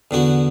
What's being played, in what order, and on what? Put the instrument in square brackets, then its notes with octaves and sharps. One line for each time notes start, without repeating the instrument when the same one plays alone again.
[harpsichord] E2 D3 B3 F#4